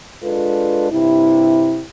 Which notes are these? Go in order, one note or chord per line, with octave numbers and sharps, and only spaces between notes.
G#3 D4 F4 A4 B4
G2 C3 E4